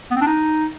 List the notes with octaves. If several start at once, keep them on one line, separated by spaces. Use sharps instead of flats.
B3
C4
D4
D#4